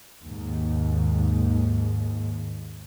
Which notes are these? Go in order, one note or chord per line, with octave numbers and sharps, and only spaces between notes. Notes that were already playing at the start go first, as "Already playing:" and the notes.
D#2 G#2